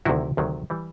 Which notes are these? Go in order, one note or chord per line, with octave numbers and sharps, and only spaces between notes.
D2 C3 D#3 F#3 E4 F#4
D2 C3 D#3 F#3
E3 G3